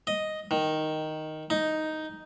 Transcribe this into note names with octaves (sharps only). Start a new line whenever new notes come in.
D#5
D#3
D#4